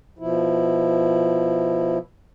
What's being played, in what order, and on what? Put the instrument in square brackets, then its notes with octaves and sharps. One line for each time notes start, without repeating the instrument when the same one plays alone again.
[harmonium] B2 F3 E4